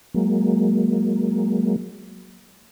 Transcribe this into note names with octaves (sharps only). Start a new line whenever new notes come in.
F#3 G#3 A#3